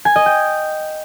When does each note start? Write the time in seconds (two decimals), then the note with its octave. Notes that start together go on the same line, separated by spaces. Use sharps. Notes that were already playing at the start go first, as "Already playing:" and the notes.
0.05 G#5
0.16 D#5
0.26 G5